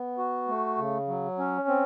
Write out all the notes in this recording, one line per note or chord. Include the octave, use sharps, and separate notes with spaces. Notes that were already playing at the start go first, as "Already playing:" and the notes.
Already playing: B3
F#4
A3
C#3
F#3
C#4
C4